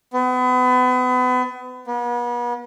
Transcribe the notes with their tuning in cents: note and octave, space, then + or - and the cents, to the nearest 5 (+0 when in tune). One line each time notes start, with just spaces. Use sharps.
B3 +35
B3 -40